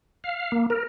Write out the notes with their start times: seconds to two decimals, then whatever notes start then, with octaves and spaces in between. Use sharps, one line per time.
0.24 F5
0.52 A#3
0.70 A#4